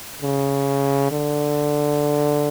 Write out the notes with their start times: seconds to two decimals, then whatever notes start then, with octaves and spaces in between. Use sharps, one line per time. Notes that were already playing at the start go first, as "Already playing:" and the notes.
0.22 C#3
1.11 D3